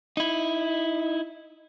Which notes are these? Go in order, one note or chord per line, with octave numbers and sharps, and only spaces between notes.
D#4 E4